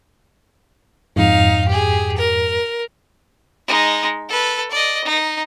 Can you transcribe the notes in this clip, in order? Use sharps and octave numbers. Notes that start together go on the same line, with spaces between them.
F2 G#2 D#4 F5
G4 G#4
A#4
G#3 D#4
A4 B4
D5 D#5
D#4